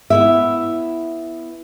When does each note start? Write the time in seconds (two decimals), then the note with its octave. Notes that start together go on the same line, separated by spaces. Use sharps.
0.10 B3 E4 E5